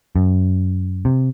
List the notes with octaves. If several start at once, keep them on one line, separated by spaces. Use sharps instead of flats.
F#2
C3